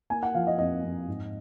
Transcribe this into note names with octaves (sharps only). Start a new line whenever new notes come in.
A#3 G#5
F#5
F3 F5
D#5
F2 D#5
F2
G#2